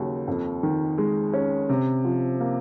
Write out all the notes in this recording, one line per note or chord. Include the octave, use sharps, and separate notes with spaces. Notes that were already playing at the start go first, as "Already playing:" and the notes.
Already playing: D#2 C#3 F#3
F2
D#3
G#3
C#4
C3
F3
A#3